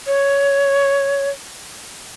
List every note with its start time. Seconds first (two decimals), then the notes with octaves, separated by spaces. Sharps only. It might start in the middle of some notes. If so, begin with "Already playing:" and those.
0.07 C#5